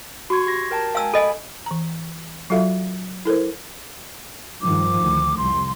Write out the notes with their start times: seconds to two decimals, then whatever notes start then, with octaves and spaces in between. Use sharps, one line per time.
0.30 F#4 C6 C#6 G#6
0.47 G4 G#6 A#6
0.71 A#4 G5 A5
0.95 F5 G5 G#5 E6
1.14 A4 D#5 G#5 B5
1.66 E3 A#5
2.50 F#3 F4 F#4 A4 E5 F5
3.25 E4 A4 A#4 C5
4.62 G2 D#3 F3 D6
5.01 D2
5.38 C2 F2 C6